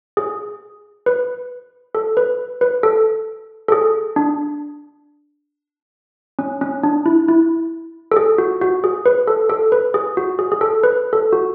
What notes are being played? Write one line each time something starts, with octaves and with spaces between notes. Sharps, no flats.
G#4
B4
A4
B4
B4
A4
A4
G#4
D4
C#4
C#4
D4
E4
E4
A4
G#4
F#4
F#4
G#4
B4
A4
A4
B4
G#4
F#4
G#4
G#4
A4
B4
A4
F#4